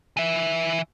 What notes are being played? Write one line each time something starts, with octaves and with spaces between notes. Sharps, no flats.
E3 E5